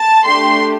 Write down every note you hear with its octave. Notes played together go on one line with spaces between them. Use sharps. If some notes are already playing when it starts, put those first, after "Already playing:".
Already playing: A5
A3 D4 G4 C6